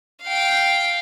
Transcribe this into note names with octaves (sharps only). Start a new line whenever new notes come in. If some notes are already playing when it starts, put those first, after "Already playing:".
F5 G5